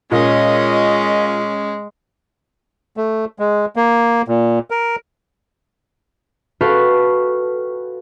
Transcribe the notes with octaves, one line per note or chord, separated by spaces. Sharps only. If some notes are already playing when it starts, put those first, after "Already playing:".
A#2 G#3 C#4 D#5
A3
G#3
A#3
A#2
A#4
F#4 A4 B4 F5 G5 C#6